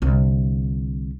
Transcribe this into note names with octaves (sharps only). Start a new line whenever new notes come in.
C2 D3